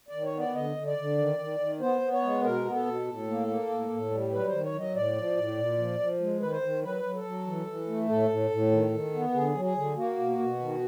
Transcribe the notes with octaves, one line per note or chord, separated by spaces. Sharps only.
D#3 D5
C#5
B3 D5
D3 D#5
D3
D5
D3
D#3
D#3
D#3
B3 C5
B3
C#5
G#3
B2 A#4
B3
A4
B2
A2
A#3
A#3
A2
A2
G3
F#3 B4
D#3 C5
C#5
F#3
D#5
A2 D5
F3
A2
A#2
F3
F3
G#3
D#3 B4
C5
D#3
F#3 B4
F#3
A4
F#3
E3
E3
A3
A2 A4
A2
A2
D#3
D#3
B3
D3 G#4
F#3
G#4
D3
A#3 F#4
B2
B2
D#3